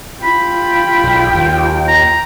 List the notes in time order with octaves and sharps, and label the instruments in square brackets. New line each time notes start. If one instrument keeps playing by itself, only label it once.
[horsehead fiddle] F4 G5 [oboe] B5
[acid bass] B1
D#2
[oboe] A#5